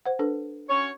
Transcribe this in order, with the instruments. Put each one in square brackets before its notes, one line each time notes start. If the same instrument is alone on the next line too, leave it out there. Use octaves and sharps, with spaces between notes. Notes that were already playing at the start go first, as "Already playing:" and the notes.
[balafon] C5 F#5
D4 A4 B4
[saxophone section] C#4 F#4 C#5